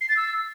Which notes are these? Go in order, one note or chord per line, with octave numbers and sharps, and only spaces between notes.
C7
A6
E6